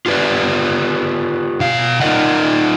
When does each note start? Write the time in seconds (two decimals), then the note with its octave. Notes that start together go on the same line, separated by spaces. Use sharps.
0.06 F4 G4 B4 D5
1.60 B2 F5
2.01 D#4 F4 A#4 D5 D#5 F#5